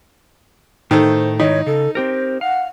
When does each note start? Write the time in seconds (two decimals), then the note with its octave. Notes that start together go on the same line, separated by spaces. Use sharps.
0.91 A2 D#3 A3 C5
1.40 G#2 D#3 D#4 E4 C#5
1.66 C#3 A4
1.95 C4 G4 A#4 C5
2.41 F5 F#5